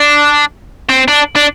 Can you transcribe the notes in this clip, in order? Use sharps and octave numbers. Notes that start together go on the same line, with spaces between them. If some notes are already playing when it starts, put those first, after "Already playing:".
Already playing: D4
C4
D4
D4